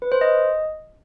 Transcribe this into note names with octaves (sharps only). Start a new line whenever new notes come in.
B4
C5
D#5